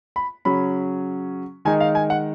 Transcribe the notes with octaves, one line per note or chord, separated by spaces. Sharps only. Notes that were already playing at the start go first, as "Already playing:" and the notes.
B5
C#3 F#3 C#4 B5
D#3 G#3 D#4 G#5
F5
G#5
F#5